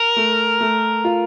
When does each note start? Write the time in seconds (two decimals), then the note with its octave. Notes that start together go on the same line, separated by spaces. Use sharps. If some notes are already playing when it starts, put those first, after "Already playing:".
Already playing: A#4
0.16 A3
0.61 A3
1.04 F4